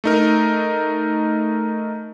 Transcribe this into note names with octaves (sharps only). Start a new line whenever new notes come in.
A3 D#4 A#4